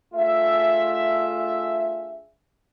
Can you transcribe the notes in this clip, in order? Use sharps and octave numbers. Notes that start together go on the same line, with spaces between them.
A3 D4 F4 G#4 E5